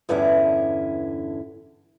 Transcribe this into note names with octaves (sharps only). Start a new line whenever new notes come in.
E2 G2 D3 C#4 E4